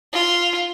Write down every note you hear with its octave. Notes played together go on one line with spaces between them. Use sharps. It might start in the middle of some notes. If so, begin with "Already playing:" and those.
F4